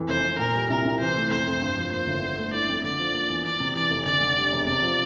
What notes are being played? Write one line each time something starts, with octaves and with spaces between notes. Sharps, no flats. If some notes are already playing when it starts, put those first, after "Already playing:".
Already playing: F2 E3
F1 C5
F1
A#2 A#4
G3
C2 A#4
C2
E3 C5
A3
F2 C5
F2
G2
F3
A#3 C5
G1
D3
A3
E4 D5
F2
D3 D5
F3
A#3
E2
E2 D5
C3
E3 D5
F1
D2 D5
D3
G3
E1
C3 D5
F3